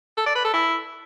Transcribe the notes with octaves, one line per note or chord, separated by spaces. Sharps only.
A4
D5
B4
A4
E4